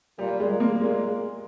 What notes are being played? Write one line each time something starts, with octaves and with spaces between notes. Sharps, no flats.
A#2 G3
G#3
A#2
A#3
A#2 G#3